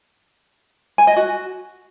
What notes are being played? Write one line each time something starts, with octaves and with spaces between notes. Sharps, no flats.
G#5
D#5
F#4